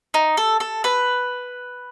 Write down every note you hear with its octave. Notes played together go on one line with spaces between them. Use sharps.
D#4
A4
A4
B4